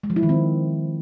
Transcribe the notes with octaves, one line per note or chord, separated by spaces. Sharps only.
G#3
F3
E4
D#3
C4